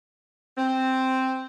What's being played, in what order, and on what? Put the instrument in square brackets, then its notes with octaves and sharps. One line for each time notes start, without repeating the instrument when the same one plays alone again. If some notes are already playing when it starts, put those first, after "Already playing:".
[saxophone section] C4